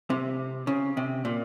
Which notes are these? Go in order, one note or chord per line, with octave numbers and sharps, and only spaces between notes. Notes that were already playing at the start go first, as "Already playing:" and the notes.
C3
C#3
C3
A#2